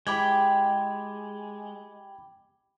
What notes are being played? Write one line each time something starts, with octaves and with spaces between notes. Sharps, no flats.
G#3 E4 G4 G5 B5 D6 G#6